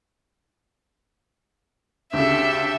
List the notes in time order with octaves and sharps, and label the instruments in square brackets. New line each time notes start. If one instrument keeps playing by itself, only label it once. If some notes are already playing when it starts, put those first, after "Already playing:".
[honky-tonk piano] D2 C#3 [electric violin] G4 A4 [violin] E5